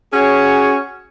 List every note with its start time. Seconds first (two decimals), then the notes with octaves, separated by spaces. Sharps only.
0.12 C#4 F#4 G#4 C#5